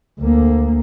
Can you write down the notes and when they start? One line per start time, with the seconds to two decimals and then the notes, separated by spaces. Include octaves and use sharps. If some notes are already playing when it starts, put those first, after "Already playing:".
0.20 D2 A#3